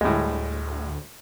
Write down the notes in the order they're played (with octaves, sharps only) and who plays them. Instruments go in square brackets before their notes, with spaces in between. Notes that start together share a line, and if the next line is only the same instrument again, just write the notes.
[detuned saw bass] D2 [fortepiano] A2 G3 G#3